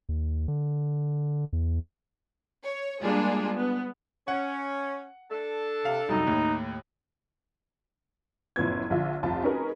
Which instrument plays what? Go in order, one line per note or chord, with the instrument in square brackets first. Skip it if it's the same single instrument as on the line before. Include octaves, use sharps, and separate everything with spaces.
[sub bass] D#2
D3
E2
[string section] C#5
G3 G#3 A#3 D4 F4 G#4
B3
[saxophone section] C#4 [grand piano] F#5
[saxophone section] D4 A4
[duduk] C3 [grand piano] F5
[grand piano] C2 F#2 [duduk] D#4
[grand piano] D#2 A2
[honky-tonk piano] F#1 A2 F3 B3 G#6
A#1 D3 F3 F4 E5
F1 C2 F4 A5
C#4 D#4 F#4 G#4 A#4 B4